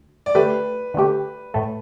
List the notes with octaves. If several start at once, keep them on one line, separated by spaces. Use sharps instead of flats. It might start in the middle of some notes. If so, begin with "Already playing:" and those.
Already playing: D2
D5
D3 A3 G4 B4
D3 A3 G4
A2 A3